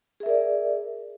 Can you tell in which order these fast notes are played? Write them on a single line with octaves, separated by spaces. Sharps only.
G#4 E5 A#4 D5